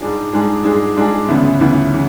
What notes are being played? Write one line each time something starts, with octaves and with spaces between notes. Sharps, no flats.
G#2 G#3 D4 G#4
G#2 G#3 D4 G#4
G#2 G#3 D4 G#4
G#2 G#3 D4 G#4
D2 C#3 E3 B3 E4
D2 C#3 E3 B3 E4
C#3 E3